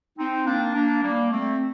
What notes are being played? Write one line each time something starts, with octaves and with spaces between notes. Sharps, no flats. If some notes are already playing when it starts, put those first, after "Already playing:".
C4 D#4
A#3 D4
A#3 D4
G3 A#3
A3 C4